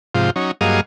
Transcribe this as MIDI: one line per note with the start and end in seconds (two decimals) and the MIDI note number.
0.15 0.30 44
0.15 0.30 48
0.15 0.30 53
0.15 0.30 65
0.36 0.51 54
0.36 0.51 61
0.36 0.51 63
0.61 0.81 43
0.61 0.81 54
0.61 0.81 58
0.61 0.81 68
0.61 0.81 75
0.61 0.81 77